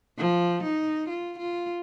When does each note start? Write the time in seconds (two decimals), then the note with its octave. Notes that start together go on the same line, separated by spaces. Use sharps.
0.18 F3
0.63 D#4
1.08 F4
1.39 F4